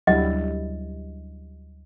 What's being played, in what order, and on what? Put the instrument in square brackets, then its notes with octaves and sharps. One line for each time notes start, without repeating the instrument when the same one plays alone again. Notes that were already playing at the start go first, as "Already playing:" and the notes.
[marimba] D2 [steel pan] F#3 G3 E4 [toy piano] D#5